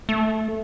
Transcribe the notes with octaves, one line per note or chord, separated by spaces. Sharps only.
A3